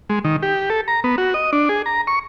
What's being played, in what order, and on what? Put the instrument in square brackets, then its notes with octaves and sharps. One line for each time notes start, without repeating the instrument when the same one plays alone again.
[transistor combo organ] G#3
D#3
G4
A4
A#5
B3
F#4
D#5
D4
G#4
A#5
C#6